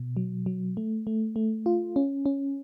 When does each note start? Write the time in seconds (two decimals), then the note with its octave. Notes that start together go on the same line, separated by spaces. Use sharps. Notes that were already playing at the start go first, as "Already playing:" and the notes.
Already playing: B2
0.17 F#3
0.46 F#3
0.77 A3
1.07 A3
1.36 A3
1.66 F4
1.96 C#4
2.26 C#4